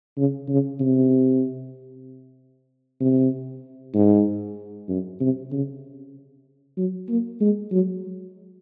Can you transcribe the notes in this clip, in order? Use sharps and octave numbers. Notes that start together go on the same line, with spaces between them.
C#3
C#3
C3
C3
G#2
F#2
C3
C#3
F#3
A#3
G#3
F#3